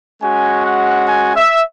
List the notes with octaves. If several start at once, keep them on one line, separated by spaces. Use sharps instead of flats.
G#3 C#4 F#4 G#5
F#5
G#5
E5